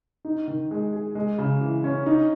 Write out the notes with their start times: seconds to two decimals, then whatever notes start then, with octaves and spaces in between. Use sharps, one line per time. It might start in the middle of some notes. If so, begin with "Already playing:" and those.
0.25 D#4
0.48 D#3
0.71 G#3
0.93 G#4
1.15 G#3
1.38 C#3
1.61 E3
1.84 C#4
2.06 D#4